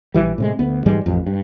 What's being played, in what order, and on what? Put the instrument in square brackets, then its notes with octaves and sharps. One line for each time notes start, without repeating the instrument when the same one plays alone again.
[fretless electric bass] A#1 E3 G3
A2 C3 G#3
D2 B3
G#2 E3 G3 G#3
A1 F2
G2